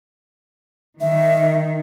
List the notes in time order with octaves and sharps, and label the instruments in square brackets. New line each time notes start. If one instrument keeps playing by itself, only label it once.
[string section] D#3 [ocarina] E5